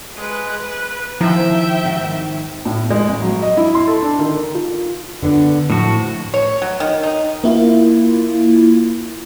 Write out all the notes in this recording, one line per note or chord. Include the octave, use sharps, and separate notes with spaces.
G#3 B4
B4
D#3 F3 E4 E5 G5 A#5
D2 G#2 D#3
A2
G#3
A1
F#3
D#5
E4
C6
A4
D4
D#3
F4
D3 B3 D4
A2 F3 F#4 A5
C#5
F#3
D#3
D#4
A#3 E4 F4